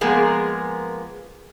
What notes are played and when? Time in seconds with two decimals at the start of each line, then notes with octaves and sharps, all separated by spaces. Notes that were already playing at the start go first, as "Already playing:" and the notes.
0.01 F3 G#3 A#3 B3 G#4 A#4